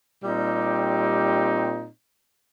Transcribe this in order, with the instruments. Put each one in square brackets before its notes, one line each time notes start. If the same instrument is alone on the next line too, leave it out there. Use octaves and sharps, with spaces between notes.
[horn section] A#2 G3 C4 D#4 G4